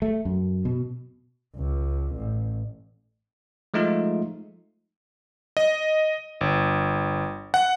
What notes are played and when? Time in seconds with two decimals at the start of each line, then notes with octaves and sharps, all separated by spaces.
0.02 A3
0.25 F#2
0.65 B2
1.56 C#2
2.15 A1
3.74 F3 G#3 A3 D#4 F4
5.57 D#5
6.41 G1
7.54 F#5